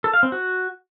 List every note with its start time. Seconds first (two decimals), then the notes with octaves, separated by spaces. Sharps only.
0.04 A4
0.14 F5
0.23 C4
0.32 F#4